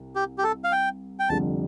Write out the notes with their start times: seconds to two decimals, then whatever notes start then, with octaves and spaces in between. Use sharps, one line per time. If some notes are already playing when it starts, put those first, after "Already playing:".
Already playing: C2
0.16 G4
0.38 G4
0.44 A4
0.64 F5
0.72 G5
1.19 G5
1.29 F1 F2 D3 G3 A5